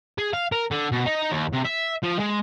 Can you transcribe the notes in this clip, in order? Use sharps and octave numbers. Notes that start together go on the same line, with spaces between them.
G#4
F5
A#4
D3
B2
D#4
D#2
C3
E5
F3
G#3